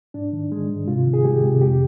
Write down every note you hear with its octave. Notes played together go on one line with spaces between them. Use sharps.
G#2 D4
D#3
G#3
G#2
C3 F4
D#3
G#4
G#3 G4
C3
F2 G4